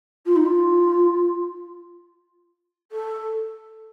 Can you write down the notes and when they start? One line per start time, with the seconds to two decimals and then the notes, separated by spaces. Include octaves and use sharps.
0.26 F4
0.36 D#4
0.45 F4
2.92 A4